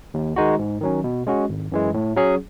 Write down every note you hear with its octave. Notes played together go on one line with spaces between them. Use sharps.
D#2
D#3 G#3 D#4 F#4
G#2
D#3 F#3 C#4
B2
G#3 C#4 F#4
G#1
F#2 E3 G#3
A2
F#3 C#4 G#4